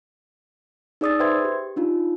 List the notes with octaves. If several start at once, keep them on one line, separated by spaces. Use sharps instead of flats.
D#4 G#4 D5 D#6 E6 A6
B4 C5 E5 G5 C6 G#6
G4
D4 D#4 F4